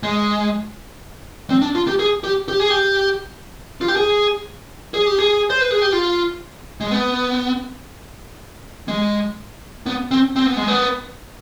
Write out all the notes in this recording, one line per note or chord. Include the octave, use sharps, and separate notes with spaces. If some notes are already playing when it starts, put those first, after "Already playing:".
G#3
C4
D4
F4
G4
G#4
G4
G4
G#4
G4
F4
G4
G#4
G#4
G4
G#4
C5
B4
G#4
G4
F4
G#3
B3
G#3
B3
C4
C4
B3
G#3
B3